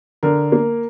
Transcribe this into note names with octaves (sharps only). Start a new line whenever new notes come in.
D3 A#4
A#3